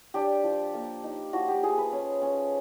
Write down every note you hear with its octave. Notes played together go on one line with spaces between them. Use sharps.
D4 G4
F3
A#3
D#4
F3 F#4
G4
F3 G#4
B4
C#4
C#4